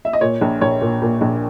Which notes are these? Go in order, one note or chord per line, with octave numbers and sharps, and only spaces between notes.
E5
D#5
A#2 C#5
A#1
A#1 C#5
A#2
A#2
A#1